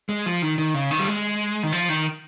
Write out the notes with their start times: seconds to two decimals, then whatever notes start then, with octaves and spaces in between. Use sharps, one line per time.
0.09 G#3
0.26 F3
0.42 D#3
0.58 D#3
0.74 C#3
0.91 D#3
1.00 G3
1.08 G#3
1.63 D#3
1.72 F3
1.89 D#3